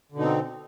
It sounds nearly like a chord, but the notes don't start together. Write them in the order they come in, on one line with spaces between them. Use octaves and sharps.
D3 B2 D#4 C4